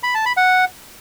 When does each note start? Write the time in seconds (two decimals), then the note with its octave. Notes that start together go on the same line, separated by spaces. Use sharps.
0.03 B5
0.14 A5
0.26 B5
0.37 F#5